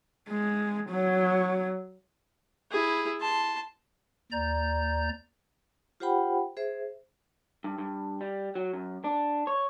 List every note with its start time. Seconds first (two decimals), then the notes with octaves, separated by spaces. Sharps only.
0.29 G#3
0.90 F#3
2.71 E4 G#4
3.21 A5 C6
4.32 D#2 D5 A#5 G6
6.00 F4 G4 C5 F#5 G5 B5
6.57 G#4 C5 E5
7.64 G2
7.78 G2
8.21 G3
8.55 F#3
8.73 F#2
9.04 D4
9.47 C#5